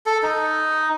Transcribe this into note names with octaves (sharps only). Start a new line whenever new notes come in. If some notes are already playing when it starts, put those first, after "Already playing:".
A4
D#4